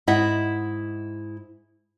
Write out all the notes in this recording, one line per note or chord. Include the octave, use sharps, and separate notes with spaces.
G#2 E4 D#5 F#5